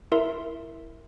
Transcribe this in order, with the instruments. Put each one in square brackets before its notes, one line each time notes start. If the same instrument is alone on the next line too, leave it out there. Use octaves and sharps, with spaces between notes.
[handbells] E4 A#4 E5 C6